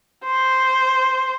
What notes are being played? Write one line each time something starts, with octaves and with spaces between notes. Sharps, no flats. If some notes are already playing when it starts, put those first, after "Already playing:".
C5